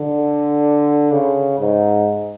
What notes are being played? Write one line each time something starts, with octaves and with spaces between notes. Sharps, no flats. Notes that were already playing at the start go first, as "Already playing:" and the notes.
Already playing: D3
C#3
G#2